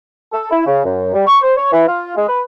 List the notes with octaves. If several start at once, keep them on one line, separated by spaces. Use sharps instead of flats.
A4
E4
C#3
F#2
G3
C#6
C5
C#5
E3
F4
G#3
B4